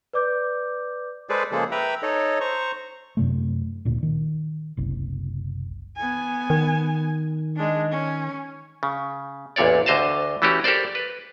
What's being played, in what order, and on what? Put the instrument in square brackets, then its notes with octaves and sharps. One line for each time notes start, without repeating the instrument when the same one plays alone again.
[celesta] B4 D5 D6 G6
[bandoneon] G#3 G#4 A4 B4 C5 D5
C#3 F3 G#3 A#3 G#4 A4
B4 E5 G5 A#5 B5
D#4 A4 C#5 D#5
C5 A#5 C#6
[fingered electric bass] F#2 C3 A3
D2 A#2
D#3
F#1 C2
[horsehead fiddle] B3 G#5
[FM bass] D#3
[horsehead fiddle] G#3 D4
C#4
[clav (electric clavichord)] C#3
A1 E2 A#2 C#5 D5
D2 D3 C5 D#5 F5 A5
E3 A3 C#4 F#4 G4
G4 A4 A#4 C5 D5
B4